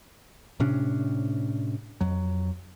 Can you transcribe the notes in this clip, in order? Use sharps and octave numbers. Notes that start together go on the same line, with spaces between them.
A2 C3 C#4 D4
F2 F#3